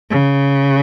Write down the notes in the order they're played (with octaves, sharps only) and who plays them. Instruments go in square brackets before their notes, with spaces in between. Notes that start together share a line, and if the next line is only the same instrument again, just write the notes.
[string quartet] C#3